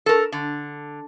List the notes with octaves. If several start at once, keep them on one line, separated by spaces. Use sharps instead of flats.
A4 A#4
D3